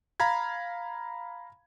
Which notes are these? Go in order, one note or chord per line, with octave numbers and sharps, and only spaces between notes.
F5 A#5 B5 G#6